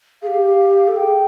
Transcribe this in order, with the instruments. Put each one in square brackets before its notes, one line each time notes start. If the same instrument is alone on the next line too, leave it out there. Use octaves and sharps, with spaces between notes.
[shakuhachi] G4 G#4 [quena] F5
[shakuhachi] A4
[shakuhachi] G#4 [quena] G5